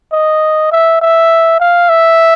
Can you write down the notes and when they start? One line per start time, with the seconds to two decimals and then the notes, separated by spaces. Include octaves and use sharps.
0.12 D#5
0.72 E5
1.02 E5
1.60 F5
1.89 E5